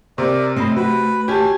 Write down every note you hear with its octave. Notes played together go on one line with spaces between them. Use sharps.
C3 A#4 D5
A3 C4 C#4 C5 D#5 B5
F#4 B4
C#4 G4 G#5 A5